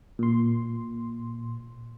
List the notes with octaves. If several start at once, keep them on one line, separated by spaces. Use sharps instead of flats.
A#2 C6